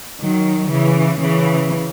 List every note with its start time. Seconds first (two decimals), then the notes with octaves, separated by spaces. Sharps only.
0.21 D#3 F#3
0.71 C#3 E3
1.20 C#3 E3